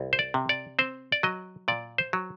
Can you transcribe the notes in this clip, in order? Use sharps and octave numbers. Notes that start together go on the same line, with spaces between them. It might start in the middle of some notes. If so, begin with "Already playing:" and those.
Already playing: C2
C5
D5
C3
D5
C4 C5
D5
F#3 D#5
A#2 D5
C5
F#3